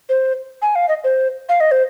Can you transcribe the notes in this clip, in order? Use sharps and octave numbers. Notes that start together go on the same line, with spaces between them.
C5
G#5
F5
D#5
C5
F5
D#5
C5